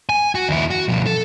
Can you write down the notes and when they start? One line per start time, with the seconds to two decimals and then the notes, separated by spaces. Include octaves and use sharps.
0.09 G#5
0.35 F#4
0.49 D#2 E4
0.70 F#4
0.89 B2 F3
1.06 A4